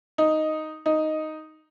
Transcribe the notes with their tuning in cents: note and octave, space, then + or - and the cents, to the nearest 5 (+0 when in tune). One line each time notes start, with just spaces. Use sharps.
D#4 +0
D#4 +0